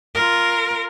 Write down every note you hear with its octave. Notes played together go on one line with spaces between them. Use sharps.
F4 A#4